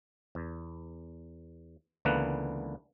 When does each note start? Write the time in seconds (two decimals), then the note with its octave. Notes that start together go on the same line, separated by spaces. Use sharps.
0.35 E2
2.05 C#2 D3 E3 A#3 B3 F#5